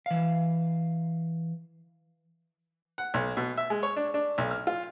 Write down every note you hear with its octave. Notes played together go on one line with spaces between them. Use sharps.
E3 F5
F#5
B1
B2
E5
G#3
C#5
D4
D4
B1
F6
F4